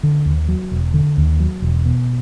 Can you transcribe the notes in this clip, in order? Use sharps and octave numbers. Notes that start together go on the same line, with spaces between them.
D3
D#2
F#3
E1
D3
D#2
F#3
E1
B2